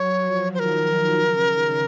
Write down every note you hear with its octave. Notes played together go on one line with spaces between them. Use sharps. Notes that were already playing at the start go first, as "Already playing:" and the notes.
Already playing: F#3 C#5
F3
D#3 A#4 C5
C#3
D#3